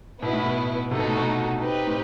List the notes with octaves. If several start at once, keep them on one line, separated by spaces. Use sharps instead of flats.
B2 B3 E4 B4
A2
B2
C3 D#4 F#4 A4
B2
A2
B2
A2
C4 D#4 G4 B4
A2